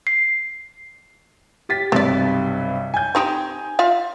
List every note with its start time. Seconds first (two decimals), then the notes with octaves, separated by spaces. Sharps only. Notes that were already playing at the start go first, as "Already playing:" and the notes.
0.07 C7
1.69 G4 A6 B6
1.92 B1 G2 C3 C4 D5
2.94 G#5 G6
3.15 C4 D#4 G4
3.79 F4 E5 F5